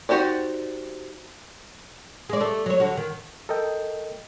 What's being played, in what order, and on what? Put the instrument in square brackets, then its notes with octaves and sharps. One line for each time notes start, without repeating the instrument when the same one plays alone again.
[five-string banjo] D#4 F#4 G4 C5 D5
[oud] G#3 D5
A3
F#3 C#5
D3 F#4
D#3
[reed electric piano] A4 A#4 D#5 G5